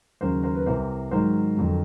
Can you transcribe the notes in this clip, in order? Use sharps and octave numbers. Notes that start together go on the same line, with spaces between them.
D#2 C#3 F#3 A#4 C5
A#4 C5
B4
C2 C3 E3 A#4 C5
G#2 D#3 F#3 A#4 C5
F2 D3 F#3